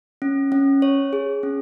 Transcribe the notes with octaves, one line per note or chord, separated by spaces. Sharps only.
C#4
C#4
C#5
G#4
C#4